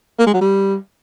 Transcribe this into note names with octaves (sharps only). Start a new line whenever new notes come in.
A#3
G#3
F#3
G3